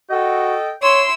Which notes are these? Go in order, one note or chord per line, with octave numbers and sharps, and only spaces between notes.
F#4 A4 D#5 G5
E4 C#5 C6 E6